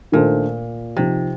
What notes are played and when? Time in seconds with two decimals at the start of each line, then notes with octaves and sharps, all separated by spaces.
0.12 A#2 D#3 A3 D4 A4 C5
0.97 C3 F3 C4 D#4